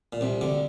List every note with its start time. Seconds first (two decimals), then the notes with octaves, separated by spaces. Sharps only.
0.13 A#2
0.21 C2 C3
0.41 D2 D3